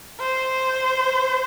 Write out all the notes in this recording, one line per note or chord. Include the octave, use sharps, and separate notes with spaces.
C5